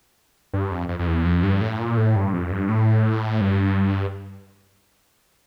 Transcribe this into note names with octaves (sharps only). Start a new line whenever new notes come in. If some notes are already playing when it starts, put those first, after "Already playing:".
G2
F2
F2
F2
E2
F2
G2
A2
A#2
A2
G2
F2
G2
A2
G2